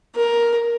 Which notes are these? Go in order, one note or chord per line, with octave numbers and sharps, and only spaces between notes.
A#4